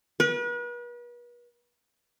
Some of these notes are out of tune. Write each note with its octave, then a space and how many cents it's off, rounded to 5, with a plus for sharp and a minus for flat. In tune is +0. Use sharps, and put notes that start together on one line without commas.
B4 -40